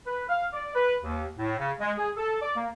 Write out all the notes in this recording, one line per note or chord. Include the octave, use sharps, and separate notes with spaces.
B4
F5
D5
B4
D#2
A2
C#3
G#3
G#4
A4
D5
A#3